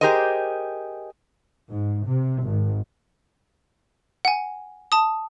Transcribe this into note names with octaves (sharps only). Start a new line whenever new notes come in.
G4 G#4 A#4 C5 D#5
G#2
C3
G#1
F#5 G#5
A5 D#6